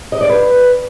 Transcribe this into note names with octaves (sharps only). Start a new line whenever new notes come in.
D#5
D5
B4